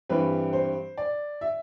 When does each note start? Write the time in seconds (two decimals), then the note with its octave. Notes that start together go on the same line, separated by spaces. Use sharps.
0.09 G2 E3 G3 C4 B4
0.53 C5
0.97 D5
1.41 E5